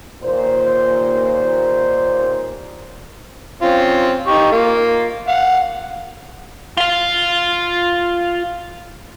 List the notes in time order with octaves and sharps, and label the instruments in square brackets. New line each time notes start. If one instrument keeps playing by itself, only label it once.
[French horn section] D#2 A#2 C5
[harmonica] C4 C#4 F4
D#4 G4 C#6
A#3 F4
F5 F#5
[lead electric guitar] F4 F5